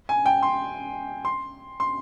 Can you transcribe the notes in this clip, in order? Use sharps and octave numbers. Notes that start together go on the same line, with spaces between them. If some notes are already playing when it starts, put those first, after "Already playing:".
G#5
G5
C6
C6
C6